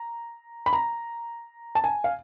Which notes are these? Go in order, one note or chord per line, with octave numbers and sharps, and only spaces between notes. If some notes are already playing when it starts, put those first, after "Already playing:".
Already playing: A#5
B5
A#5
A5
G#5
F5